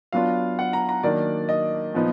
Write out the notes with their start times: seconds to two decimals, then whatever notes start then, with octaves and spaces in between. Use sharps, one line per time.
0.13 F#3 B3 D4 F4 F5
0.59 F#5
0.73 A#5
0.89 A#5
1.03 D#3 F#3 A#3 D4 D5
1.49 D#5
1.94 A#2 F3 B3 D#4